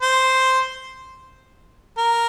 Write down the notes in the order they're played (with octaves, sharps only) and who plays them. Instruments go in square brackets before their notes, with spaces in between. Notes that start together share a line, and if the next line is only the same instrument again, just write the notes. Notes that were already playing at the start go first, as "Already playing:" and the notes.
[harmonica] C5
A#4